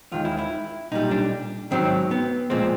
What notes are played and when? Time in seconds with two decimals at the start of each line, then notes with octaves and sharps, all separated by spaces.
0.12 D#2 D#3 G#3 F4
0.25 E4
0.38 E4
0.92 B1 A#2 G3 D#4
1.11 D4
1.71 G#2 D#3 F#3 C4
2.11 B3
2.50 A#2 F3 G#3 C4